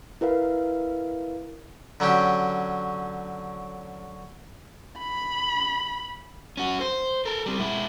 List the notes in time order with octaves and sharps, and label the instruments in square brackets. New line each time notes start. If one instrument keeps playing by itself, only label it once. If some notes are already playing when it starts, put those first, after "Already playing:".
[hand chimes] E4 A#4 B4 F5
[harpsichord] D3 F#3 C#4 G4
[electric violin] B5
[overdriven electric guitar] C#4 F#4
C5
A4 A#4
G3 C4
G#3 E4